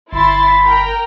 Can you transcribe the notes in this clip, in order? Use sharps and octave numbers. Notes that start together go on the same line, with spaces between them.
G1 E4 B5 C6 A6
A#4 G5 A#5